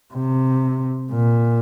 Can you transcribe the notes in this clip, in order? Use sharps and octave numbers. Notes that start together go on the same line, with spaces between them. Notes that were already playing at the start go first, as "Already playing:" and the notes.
C3
A#2